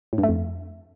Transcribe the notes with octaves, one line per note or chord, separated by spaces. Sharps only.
A2
G2
A3
F2